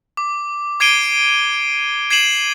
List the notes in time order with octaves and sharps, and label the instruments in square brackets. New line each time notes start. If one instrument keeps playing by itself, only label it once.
[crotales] D6
D6 G#6 C7 D7 D#7 G7
G#6 C7 D#7 E7 F#7